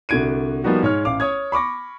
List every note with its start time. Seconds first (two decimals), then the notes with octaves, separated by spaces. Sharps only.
0.09 C2 D3 F#4 G#6 D7 D#7
0.64 F3 G3 A#3 B3 D#4 F#4
0.83 G#2 C#5 F6
1.05 A1 F5 D6
1.20 C#5 D#6 G#6
1.52 B5 C#6 D6 A#6